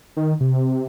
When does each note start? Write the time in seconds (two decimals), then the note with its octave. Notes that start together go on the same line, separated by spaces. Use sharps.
0.17 D#3
0.40 C3